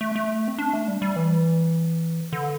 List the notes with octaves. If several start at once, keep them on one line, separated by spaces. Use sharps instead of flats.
A3
A3
C4
D4
A3
G3
G3
E3
D3